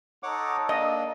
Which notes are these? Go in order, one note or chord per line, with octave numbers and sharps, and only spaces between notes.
D#4 A4 C#5 F#5 D6
A#3 D4 D#5